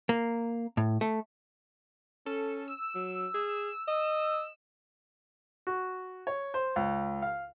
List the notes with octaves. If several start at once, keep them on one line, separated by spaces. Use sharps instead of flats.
A#3
A2
A3
C#4 A4
E6
F#3
G#4
D#5
F#4
C#5
C5
C#2
F5